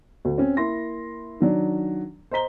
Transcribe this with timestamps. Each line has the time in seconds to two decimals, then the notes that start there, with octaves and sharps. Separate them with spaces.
0.25 D2
0.38 C4 C#4
0.57 A#3 E4 C6 A#6
1.40 D#3 F#3 D4
2.31 C5 D#5 A#5 B6 G7